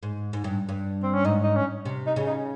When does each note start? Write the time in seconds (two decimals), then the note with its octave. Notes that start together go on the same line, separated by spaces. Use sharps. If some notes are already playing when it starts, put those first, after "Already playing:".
0.03 G#2
0.33 G#2
0.44 G2
0.69 G2
1.03 C4
1.14 C#4
1.25 G#2 D#4
1.43 D#4
1.55 C#4
1.85 C3
2.06 D#4
2.16 C#3
2.27 D#4